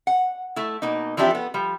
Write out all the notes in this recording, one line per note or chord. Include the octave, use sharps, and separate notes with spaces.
F#5
A3 E4
B2 A#3 D#4
E3 F3 C4 D4 G4 E5
B3 A4
F3 G3